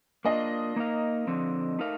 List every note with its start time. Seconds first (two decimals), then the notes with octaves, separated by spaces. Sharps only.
0.25 A#3 D4 F4 D#5
0.76 A#3 D#4 A#4 F5
1.27 D3 F3 C4
1.79 A3 D#4 A#4 F5